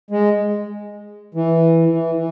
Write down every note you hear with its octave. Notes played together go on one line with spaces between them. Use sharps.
G#3
E3
E3
E3